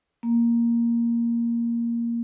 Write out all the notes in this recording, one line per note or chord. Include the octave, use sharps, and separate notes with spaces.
A#3